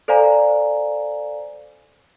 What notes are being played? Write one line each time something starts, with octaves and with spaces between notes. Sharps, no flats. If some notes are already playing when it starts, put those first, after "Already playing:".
A4 C5 D5 F5 G#5 A#5